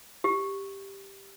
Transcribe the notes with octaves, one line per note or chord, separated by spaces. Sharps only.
G4